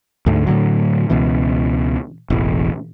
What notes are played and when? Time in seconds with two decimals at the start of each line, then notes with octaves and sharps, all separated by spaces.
0.26 D2 G#2 D3 A3
0.47 A2 D3 F#3
1.10 C#2 B2 E3
2.30 E1 A1